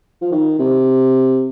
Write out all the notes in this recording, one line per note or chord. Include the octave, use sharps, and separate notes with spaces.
F3
D#3
C3